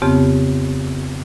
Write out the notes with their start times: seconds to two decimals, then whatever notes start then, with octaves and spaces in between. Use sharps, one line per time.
0.02 F2 C#3 B3 C4 G4